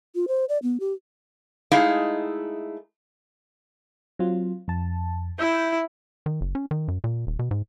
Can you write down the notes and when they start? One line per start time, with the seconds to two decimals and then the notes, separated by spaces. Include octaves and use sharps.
0.15 F4
0.28 C5
0.49 D5
0.63 B3
0.80 G4
1.71 G#3 A3 D#4 E4 G#4 F5
4.19 F#3 C4 F4
4.68 F2 A5
5.39 E4 E6 G6
6.26 D#3
6.41 F#1
6.55 C#4
6.71 D#3
6.88 F#2
7.04 A#2
7.27 D#1
7.39 B2
7.51 G#2